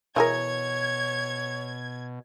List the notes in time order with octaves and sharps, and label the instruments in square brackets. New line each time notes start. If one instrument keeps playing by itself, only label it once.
[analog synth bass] B2 [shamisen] E3 G#4 A#4 [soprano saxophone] C#5 [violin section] G#6